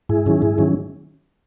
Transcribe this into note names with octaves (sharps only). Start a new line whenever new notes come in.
G#2 E4 G#4
D#3 F#3 C#4
G#2
D#3 F#3 C#4